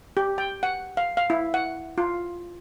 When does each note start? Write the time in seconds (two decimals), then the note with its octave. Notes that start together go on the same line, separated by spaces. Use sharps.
0.17 G4
0.38 G5
0.63 F#5
0.97 F5
1.17 F5
1.30 E4
1.54 F#5
1.98 F4